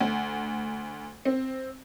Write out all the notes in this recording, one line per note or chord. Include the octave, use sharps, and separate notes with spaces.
D2
C4